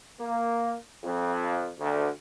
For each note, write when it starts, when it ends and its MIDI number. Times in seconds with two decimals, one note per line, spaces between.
0.20 0.73 58
1.03 1.68 41
1.78 2.08 38